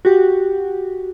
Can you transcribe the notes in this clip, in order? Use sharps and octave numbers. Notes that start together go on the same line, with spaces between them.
F#4 G4